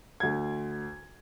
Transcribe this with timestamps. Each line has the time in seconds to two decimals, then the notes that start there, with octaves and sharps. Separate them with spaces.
0.20 D2 G#6